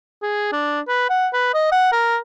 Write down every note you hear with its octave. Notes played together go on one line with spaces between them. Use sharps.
G#4
D4
B4
F#5
B4
D#5
F#5
A#4